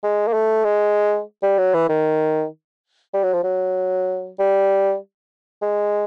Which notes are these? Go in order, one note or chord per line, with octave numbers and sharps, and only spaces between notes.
G#3
A#3
A3
G#3
G3
F#3
E3
D#3
G3
F#3
F3
F#3
G3
G#3